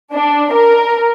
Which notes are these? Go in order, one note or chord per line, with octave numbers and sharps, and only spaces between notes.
D4
A#4